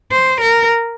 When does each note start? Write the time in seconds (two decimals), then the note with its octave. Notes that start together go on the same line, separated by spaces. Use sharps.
0.11 C5
0.41 A#4